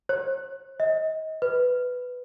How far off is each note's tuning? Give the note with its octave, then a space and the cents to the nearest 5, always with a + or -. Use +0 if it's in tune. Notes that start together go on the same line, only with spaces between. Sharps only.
C5 +45
D#5 +30
B4 +5